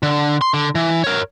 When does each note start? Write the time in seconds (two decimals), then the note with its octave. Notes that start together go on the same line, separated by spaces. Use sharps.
0.03 D3
0.41 C6
0.54 D3
0.75 E3
1.04 A#4 C#5